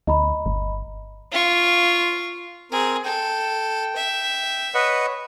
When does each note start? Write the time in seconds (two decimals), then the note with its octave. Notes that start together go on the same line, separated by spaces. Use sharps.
0.07 D2 D#5 A#5 B5
0.46 G1
1.32 F4 C#6
2.72 C4 G#4 A#4
3.05 A4 G5
3.96 E5
4.74 B4 C#5 D#5 F#5